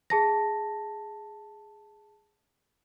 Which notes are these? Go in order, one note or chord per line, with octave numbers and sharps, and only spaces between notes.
G#4 A5 A#6